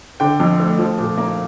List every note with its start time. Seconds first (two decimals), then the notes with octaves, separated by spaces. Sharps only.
0.20 D3 G5
0.40 F2
0.60 A3
0.79 F3
0.98 A#2
1.18 A#3